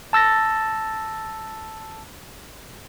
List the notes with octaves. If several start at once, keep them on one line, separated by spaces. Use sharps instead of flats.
A5 E6 A6 A#6